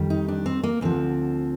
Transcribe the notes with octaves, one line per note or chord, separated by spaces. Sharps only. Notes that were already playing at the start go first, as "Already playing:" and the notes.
Already playing: F2 D#3 G3
D#4
D4
C4
A#3
D2 D3 F3 C4